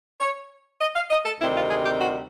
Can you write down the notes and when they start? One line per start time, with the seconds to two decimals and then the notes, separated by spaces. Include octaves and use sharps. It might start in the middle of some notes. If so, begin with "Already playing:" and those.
0.21 C#5
0.81 D#5
0.96 F5
1.10 D#5
1.26 A4
1.40 D2 C3 D#3 G3 C4 E4
1.56 F4
1.71 G#4
1.85 G4
2.01 F#4